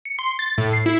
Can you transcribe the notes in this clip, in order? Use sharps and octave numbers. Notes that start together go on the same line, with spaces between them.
C#7
C6
A6
A2
C7
E4